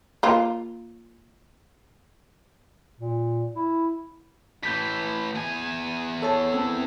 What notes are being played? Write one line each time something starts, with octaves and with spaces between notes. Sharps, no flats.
A#3 F4
A#2
E4
A2 E3 G6 B6
E2 G#5
A4 C#5 A5
C4 A4